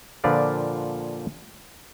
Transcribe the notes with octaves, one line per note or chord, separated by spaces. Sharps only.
A#2 D3 F3 B4 D5 F5